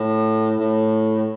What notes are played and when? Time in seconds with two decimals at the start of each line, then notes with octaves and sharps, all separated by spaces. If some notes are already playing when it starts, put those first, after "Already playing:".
Already playing: A2
0.60 A2